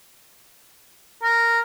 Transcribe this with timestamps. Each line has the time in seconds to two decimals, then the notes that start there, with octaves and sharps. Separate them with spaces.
1.23 A#4